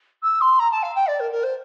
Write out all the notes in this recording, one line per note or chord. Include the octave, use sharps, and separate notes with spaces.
E6
C6
A#5
A5
F5
G5
D5
A#4
A#4
C5